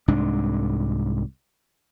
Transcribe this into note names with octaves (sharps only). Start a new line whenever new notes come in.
C2 G#2 D4